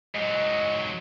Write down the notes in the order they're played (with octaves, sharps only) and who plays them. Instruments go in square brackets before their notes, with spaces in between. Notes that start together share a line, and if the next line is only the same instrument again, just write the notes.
[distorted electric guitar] G#2 F#3 [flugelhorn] D#5